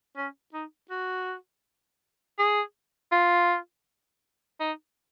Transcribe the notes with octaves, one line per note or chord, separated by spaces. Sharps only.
C#4
D#4
F#4
G#4
F4
D#4